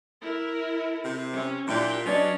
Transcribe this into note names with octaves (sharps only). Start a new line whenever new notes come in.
E4 A#4
C3
C#4 E5
A#2 D4 E4 G4 D5 G5
F#3 C#4 D4 B4 D5 D#5